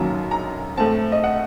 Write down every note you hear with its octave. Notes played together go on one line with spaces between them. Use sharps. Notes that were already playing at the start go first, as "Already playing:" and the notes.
Already playing: F#2 D#3 F#3 A#3 A5 A#5
A#5
A2 A3 C4 A5
D#5
F#5